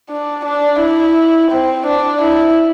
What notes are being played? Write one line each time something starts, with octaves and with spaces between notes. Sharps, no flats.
D4
D4
E4
C4
D4
E4